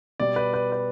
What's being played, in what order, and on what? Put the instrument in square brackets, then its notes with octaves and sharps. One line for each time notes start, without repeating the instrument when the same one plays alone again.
[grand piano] B2 G3 D5
B4
B4
B4